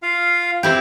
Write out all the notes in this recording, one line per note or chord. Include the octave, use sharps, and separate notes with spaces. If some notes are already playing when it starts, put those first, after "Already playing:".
F4 F5
C4 E4 G4